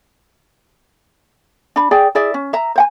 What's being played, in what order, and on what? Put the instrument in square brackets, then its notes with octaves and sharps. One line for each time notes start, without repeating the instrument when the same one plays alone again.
[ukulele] D4 B5
G#4 C5 D5 G5
E4 G#4 D5 E5
C#4
E5 A#5
C5 F#5 G#5